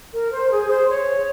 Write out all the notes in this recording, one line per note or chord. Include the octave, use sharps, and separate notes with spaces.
A#4
C5
G#4
C5
C#5